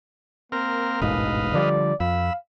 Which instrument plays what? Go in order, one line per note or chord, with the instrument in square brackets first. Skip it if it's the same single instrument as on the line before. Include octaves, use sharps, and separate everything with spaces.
[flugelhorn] A#3 [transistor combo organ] C4 A#4 F6
[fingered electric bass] E1 A1 G#2 [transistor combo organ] B4 D#5 F5
[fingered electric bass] D3 F3 G3 [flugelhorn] D5
[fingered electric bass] F2 [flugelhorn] F5 [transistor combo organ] B5 E6